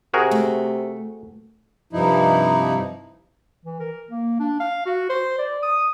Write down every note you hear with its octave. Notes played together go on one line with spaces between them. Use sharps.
C3 F#4 G#4 A#4
A3
G2 C3 F3 D#4 E4
E3
A#4
A#3
D4
F5
F#4
C5
D5
D#6